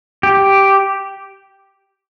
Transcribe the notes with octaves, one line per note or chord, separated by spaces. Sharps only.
G4